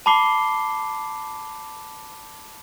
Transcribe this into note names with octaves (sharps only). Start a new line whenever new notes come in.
A5 B5 D6 C7 G7